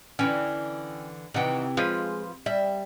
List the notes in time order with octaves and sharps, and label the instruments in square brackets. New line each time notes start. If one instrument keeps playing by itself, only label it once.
[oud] D3 E3 [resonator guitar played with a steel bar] C#4 G5
[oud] C3 E3 [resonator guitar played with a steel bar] D#3 F#5 G5
[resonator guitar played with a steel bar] F3 F4 B4 [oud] G#3
[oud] G3 [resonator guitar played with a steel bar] E5